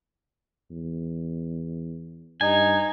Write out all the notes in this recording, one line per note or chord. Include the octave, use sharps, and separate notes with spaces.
E2
G2 D#4 G#5